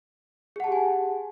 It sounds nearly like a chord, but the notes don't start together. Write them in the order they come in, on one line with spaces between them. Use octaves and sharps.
G#4 F#5 A5 G4 G#5